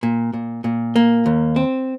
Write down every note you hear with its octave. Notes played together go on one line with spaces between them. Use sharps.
A#2
A#2
A#2
A#3
D#2
C4